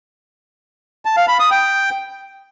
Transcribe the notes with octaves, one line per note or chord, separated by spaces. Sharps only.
A5
F5
B5
D#6
G5